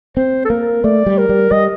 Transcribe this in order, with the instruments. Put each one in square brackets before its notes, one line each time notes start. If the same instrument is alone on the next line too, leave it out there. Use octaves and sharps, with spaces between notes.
[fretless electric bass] C4 [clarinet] C5
[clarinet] A4
[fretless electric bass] A#3 [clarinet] A#4
[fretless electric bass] A3 [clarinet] D5
[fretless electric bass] G3
[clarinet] A#4
[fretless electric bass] G3
[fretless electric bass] G3 [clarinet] D#5